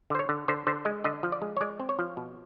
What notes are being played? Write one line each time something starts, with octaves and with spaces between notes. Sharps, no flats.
D3 C5
C#5
D3
D3 C5
D3 C5
G#3 D#5
D3 D#5
F3
D5
G#3
C#5
G#3 D5
C4
C#5
F3
B2